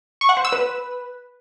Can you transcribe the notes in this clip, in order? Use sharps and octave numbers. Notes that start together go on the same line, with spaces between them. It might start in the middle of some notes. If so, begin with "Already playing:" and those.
C#6
F#5
C5
E6
B4